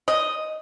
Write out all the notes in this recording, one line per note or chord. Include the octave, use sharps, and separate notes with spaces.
D#5